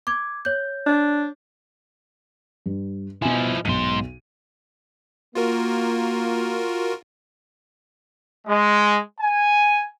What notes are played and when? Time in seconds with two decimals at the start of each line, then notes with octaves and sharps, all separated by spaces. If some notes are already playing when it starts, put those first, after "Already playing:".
0.07 D6 G#6
0.45 C#5 G6
0.86 D4
2.66 G2
3.22 B2 F3 E4 G#5
3.65 B1 G#2 C6 D#7
5.35 A#3 F4 F#4 A#4
8.47 G#3
9.20 G#5